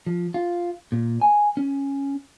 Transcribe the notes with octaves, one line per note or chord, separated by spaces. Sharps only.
F3
F4
A#2
G#5
C#4